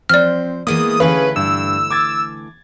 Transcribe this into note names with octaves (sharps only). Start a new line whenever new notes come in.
F3 C4 C5 D5 F6
E3 G#3 A#3 B3 D#6
D3 E3 A3 C#4 G#4 B4 F5
G2 E6
D6 G#6 A6